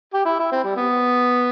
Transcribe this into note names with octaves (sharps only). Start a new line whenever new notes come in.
G4
E4
E4
C4
G3
B3